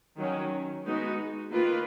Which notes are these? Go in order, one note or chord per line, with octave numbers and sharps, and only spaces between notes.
D#3 F#3 C#4
G#3 B3 D#4 F#4
D#3 A#3 F4 B4